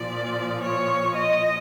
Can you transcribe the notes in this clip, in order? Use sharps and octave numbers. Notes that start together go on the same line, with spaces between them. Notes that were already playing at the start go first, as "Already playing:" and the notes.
Already playing: A#2 F3 D5
C#5
D#5